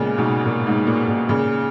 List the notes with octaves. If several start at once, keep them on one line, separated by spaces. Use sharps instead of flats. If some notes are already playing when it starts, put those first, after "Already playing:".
Already playing: A#2 C#3 G#3 B3
G#2 B2
A#2
G#2
A#2
A#2
A#2 C#3